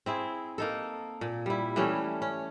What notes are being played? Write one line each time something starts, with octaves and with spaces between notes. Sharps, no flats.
C4 E4 G#4
A#3 D#4 A4
A#2
G3 E4
E3 G3 A3 C#4
C#4